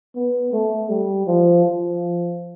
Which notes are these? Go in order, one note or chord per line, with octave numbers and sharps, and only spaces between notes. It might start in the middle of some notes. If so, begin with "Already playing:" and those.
B3
A3
G3
F3
F3